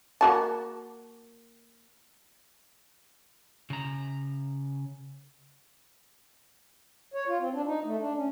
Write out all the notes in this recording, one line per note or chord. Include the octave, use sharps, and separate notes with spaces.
A#3 F#4 A5
C#3 A#5
C#5
F4
C4
D4
D#4
A3
D4
C#4